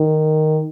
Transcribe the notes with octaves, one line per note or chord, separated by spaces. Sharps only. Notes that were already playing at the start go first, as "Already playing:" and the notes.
Already playing: D#3